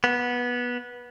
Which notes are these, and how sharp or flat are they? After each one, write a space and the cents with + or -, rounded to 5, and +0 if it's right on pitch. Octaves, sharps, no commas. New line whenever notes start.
B3 -15